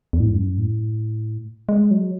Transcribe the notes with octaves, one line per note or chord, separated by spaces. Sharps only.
E2
A2
G#2
F#2
A2
G#3
F#3